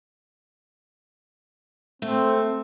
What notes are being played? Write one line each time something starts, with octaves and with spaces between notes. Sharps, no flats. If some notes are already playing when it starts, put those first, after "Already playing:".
A3 C4